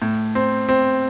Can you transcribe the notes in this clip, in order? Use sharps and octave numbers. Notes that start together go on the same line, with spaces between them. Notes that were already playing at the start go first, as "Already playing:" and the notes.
A2
C4
C4